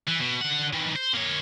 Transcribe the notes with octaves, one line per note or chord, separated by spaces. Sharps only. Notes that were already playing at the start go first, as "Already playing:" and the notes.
E3
B2
D3 F#5
D#3 E3
C5
A#3 C#5